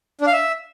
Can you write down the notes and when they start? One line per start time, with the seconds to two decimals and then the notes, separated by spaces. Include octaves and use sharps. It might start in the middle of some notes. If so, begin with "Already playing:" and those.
0.21 D4
0.27 F5
0.33 E5